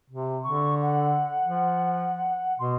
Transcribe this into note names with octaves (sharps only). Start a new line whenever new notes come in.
C3
D3 C#6
F#5
F3
B2 C6